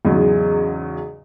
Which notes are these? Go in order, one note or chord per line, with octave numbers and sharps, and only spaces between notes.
E2 G#2 C#3 F#3 G#3